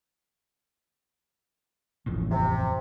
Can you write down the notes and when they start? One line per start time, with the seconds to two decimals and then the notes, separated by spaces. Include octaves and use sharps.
2.06 D#1 A1 F2
2.31 C3